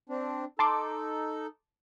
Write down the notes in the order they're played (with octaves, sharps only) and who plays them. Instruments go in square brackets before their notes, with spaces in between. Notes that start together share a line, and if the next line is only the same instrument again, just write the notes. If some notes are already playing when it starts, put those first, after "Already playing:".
[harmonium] C4 D4
[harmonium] D#4 A4 [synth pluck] A5 C6 D6